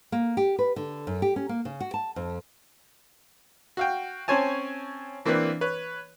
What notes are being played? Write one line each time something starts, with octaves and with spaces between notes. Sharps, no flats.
A#3
G4
B4
D3
F#2
G4
C#4
A#3
C#3
F#4
A5
F2
F#4 F5 G5
C4 C#4 C5 C#5 G#5 A5
E3 A#3 C4 D4 B4
B4 C#5